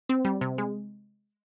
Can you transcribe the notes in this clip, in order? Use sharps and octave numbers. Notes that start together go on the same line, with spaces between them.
C4
G3
C3
G#3